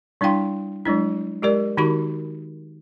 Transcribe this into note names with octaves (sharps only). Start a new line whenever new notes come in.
G3 D4 E4 F5 G5 C6
F#3 G#3 D4 E4
G#3 G4 A#4 D5
D#3 D#4 F#4 G4 B5 C#6